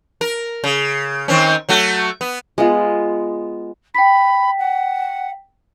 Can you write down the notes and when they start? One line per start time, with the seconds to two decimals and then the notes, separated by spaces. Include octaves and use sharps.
0.21 A#4
0.64 C#3
1.28 D#3 C4 C#4
1.69 F#3 A3 F#4
2.21 B3
2.58 G#3 B3 F4
3.95 G5 B5 B6
4.59 F#5